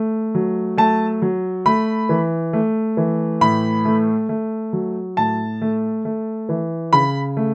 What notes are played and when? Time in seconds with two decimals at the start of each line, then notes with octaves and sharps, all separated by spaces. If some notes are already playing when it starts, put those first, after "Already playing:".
Already playing: A3
0.35 F#3
0.77 A3 A5
1.22 F#3
1.66 A3 B5
2.09 E3
2.53 A3
2.97 E3
3.41 A2 B5
3.85 A3
4.29 A3
4.73 F#3
5.17 A2 A5
5.61 A3
6.05 A3
6.49 E3
6.93 C#3 B5
7.37 A3